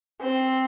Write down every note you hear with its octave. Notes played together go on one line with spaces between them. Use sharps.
C4